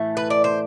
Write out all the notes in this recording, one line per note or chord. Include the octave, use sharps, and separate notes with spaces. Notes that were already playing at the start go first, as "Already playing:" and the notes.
Already playing: A2 E3 A3
B4
D5
C5